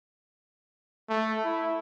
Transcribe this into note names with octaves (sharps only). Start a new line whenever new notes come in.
A3
E4